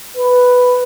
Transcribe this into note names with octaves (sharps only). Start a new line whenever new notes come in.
B4